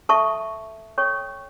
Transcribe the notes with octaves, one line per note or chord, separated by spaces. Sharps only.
A4 E5 A5 C#6
A4 C#5 G5 C#6